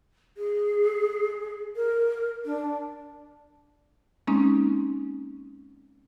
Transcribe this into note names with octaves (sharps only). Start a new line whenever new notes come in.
G#4
A#4
D4
G#3 A#3 C4 C#4 D#4